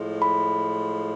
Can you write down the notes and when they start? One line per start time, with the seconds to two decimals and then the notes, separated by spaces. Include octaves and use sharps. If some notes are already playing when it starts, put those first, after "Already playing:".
Already playing: A2 F3 G#3
0.22 B5